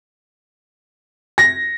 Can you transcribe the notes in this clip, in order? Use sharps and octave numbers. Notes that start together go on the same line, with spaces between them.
A#6